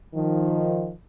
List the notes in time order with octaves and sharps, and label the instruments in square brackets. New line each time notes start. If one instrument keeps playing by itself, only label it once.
[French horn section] D#3 F3